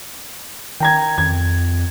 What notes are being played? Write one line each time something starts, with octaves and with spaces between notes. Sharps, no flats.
D#3 G5 A#5 G#6
F2 G#6